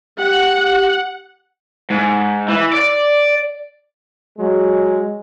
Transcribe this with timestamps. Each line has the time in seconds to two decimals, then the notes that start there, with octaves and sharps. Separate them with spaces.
0.19 G4 F#5
1.90 G#2
2.48 E3
2.74 D5
4.38 F#3 G#3